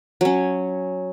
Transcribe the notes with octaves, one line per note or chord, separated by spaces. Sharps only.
F#3 C#4